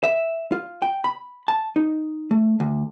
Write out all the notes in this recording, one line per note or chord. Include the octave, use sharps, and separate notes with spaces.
E5
F4
G5
B5
A5
D#4
A3
D2